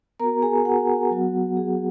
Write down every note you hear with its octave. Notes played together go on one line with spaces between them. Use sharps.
B3 F#4 A#4 A#5
G#4 G#5
F#4 F#5
F#3 B3 F#4
G#4